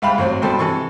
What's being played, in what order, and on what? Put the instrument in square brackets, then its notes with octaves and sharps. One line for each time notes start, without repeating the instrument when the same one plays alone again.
[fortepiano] C2 G#2 E5 F5 G5 B5
A1 F#3 C4
G2 B2 A4 C5 G5 C6
C3 E3 A4 C#6